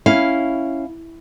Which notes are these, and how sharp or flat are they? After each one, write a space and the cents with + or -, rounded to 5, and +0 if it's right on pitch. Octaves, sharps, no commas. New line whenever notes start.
C#4 +0 E4 +0 F5 +0